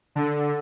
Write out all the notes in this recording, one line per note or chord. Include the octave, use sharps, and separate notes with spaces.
D3